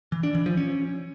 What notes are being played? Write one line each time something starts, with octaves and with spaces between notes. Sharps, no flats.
E3
D4
E3
F3
C#4